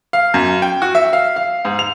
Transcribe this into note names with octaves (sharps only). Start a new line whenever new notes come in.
F5
F#2
G5
F#4
E5
F5
F5
G#2
F7